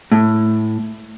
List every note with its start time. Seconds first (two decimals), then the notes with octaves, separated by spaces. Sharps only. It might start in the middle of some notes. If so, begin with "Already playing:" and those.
0.12 A2